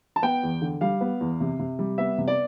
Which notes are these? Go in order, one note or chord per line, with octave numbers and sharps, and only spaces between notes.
A5
B3 G5
E2
D3
G3 F5
B3
E2
C3
C3
G3
B3 E5
C3
D5